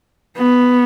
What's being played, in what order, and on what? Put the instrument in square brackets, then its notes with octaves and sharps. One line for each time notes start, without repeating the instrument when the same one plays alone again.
[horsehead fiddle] B3